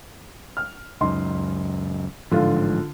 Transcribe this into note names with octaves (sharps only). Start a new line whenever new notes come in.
F6
C#2 F#2 D#4 D#5 C6
A1 G#2 D3 F3 F4